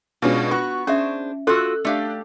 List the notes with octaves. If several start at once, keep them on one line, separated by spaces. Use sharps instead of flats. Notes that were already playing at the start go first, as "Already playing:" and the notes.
B2 G#3 C#4 D4 F4
B3 F4 F#4 C#6
C#4 D4 G#4 C5 E5
F4 F#4 A4 E6 F#6
A3 D4 G4 F5